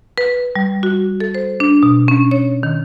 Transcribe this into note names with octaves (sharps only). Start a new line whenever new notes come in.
B4
G3
F#4
A4
C5
D4
B2
C#4
C#5
D#3